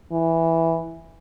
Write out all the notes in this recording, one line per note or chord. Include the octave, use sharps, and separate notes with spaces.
E3